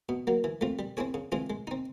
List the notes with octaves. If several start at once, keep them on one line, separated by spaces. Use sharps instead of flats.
B2
F#3 A#3
E3
A3 C4 F4
G3
C4 E4 G#4 C#5
C#3
E3 G#3 C4 F4
G#3
C4 D#4